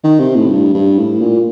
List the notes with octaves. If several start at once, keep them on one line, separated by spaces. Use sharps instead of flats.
D#3
C3
A2
G2
G2
A2
A#2